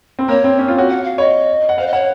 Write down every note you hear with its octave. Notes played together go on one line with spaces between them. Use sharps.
C4
A#3 C#5
C4
C#4
F4
F#4
F#5
F5
C#5 D#5
F#5
C5 F5
D#5
C#5 F#5